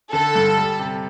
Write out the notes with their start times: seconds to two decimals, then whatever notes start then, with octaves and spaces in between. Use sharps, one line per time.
0.12 D3 A4
0.36 G2
0.58 G3
0.80 C3